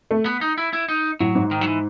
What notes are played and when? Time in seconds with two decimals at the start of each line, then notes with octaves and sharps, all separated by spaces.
0.11 A3
0.26 B3
0.41 D#4
0.58 E4
0.73 E4
0.89 D#4
1.20 A2 F#3
1.35 G#2
1.51 D#3
1.61 F#3
1.67 E3